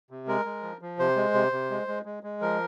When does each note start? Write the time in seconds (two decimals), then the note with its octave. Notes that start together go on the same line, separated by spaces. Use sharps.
0.10 C3
0.27 G#3 A#4
0.45 G#3
0.63 F3
0.81 F3
0.99 C3 C5
1.16 G#3
1.34 C3
1.52 C3
1.71 G#3
1.88 G#3
2.05 G#3
2.23 G#3
2.41 F3 A#4